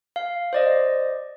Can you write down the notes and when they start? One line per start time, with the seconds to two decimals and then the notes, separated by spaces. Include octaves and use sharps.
0.16 F5
0.53 C5 D5 D#5